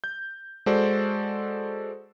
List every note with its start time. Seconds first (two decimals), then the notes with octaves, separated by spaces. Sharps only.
0.04 G6
0.66 G#3 F#4 A4 C5 D5